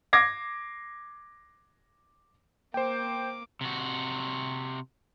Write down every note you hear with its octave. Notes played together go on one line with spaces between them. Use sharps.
D6 G#6 A#6 C7
A#3 C5 G5 D6
C3 F#4